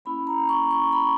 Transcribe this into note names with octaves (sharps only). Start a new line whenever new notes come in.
A#3 C#4 E4 B5
A#5
C#6
C#6
B5